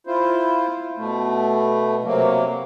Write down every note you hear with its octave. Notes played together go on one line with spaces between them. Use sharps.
E4 F4 C5
B2 A3
C3 F#3 A#3